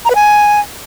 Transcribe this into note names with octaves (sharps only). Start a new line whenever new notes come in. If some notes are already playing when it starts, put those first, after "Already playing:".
A#5
B4
G#5